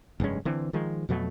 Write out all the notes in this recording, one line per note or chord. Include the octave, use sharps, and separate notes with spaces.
F1 G2 G#3 C#4
D3 E3 C4
D#3 F3 G#3
F2 B2 F#3 A3